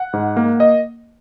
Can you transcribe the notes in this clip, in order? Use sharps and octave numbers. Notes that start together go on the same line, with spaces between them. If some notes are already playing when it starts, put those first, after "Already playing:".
Already playing: F#5
G#2
A#3
D#5